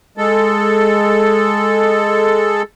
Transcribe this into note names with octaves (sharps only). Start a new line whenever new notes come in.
G#3 A4